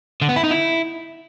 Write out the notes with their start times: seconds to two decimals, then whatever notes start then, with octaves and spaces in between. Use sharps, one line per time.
0.21 D3
0.29 B3
0.36 E4
0.43 D#4
0.51 E4